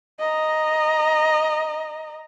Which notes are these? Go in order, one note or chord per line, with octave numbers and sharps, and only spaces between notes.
D#5 A#5